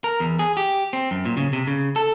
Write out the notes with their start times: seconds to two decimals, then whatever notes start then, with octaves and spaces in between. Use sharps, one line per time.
0.04 A#4
0.20 E2
0.39 G#4
0.57 G4
0.93 C4
1.11 F#2
1.25 A#2
1.37 C#3
1.53 C3
1.67 C#3
1.96 A4